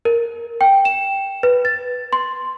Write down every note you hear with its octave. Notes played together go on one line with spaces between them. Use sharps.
A#4
G5
E7
B4
A6
C6